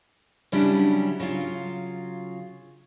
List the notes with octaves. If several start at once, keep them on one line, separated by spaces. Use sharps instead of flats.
C#3 F#3 G3 C#4 D4 E4
C#3 F#3 F4